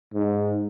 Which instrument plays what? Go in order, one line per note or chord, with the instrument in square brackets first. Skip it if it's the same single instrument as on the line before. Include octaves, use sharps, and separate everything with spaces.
[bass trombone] G#2